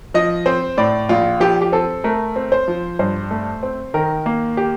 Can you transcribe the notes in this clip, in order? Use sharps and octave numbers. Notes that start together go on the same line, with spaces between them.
F3 D#5
C4 C5
A2 D5
A#1 F4
F3 G4
G4
C4 A4
A3 A#4
C4
C5
F3
G2 C5
A3
C4
D#3 A#4
A#3
G4